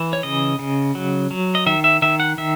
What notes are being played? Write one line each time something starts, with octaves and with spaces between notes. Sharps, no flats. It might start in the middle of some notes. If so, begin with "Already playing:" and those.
Already playing: E3
C#5
C#3 D#5
C#3
F#3
F#3
D#5
D#3 E5
E5
D#3 E5
F#5
D#3 E5